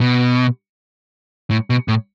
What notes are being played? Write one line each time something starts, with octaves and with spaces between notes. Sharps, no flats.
B2
A2
B2
A2